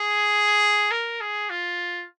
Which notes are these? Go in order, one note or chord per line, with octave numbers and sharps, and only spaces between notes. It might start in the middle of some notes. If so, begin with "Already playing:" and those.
Already playing: G#4
A#4
G#4
F4